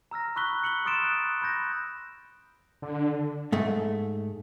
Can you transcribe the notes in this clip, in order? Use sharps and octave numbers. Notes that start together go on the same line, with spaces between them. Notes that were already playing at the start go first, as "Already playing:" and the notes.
A#5 E6 F6 A#6
B5 C#6 E6 F#6 B6 G7
C#7 F#7 G7
C6 D#6 F6 A6 D7 E7
F#6
B5 F#6 G6 A#6
D3
G#2 A3